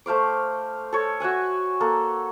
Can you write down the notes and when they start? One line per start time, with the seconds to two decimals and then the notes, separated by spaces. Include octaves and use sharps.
0.06 A3 C5 F5 D6
0.93 A4 C#5
1.20 F#4 E5 F#5 G#5
1.80 A#3 A4